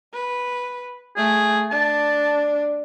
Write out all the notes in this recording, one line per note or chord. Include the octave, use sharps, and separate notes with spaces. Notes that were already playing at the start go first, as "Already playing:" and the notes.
B4
A3 G#4
D4 A5